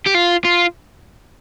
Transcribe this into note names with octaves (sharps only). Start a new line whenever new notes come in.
G4
F4
F4